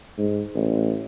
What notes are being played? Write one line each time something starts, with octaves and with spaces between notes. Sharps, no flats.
G#2
A1